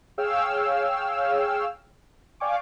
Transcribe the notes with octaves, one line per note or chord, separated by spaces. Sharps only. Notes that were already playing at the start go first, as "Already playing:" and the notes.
G#4 C#5 F5 G5 E6 F6
D5 F5 G5 G#5 C#6 D6